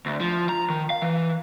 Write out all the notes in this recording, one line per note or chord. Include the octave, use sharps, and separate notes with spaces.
D2
F3
A#5
D#3
F5
E3